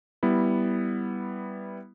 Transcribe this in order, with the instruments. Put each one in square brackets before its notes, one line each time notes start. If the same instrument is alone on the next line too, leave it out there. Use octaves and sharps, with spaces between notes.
[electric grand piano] G3 B3 E4